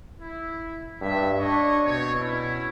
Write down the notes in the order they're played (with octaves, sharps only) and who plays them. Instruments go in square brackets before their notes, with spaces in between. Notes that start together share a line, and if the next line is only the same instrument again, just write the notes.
[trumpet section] E4
[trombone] G2 [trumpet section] E5
[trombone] D4 [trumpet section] C#5 D#5 C#6
[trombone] B2 [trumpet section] C4 C#5
[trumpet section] C#4 E4